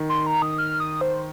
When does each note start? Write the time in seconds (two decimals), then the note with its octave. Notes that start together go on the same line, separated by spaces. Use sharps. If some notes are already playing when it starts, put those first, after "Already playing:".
Already playing: D#3
0.09 C6
0.26 A#5
0.42 D#6
0.58 F6
0.80 D#6
1.01 C5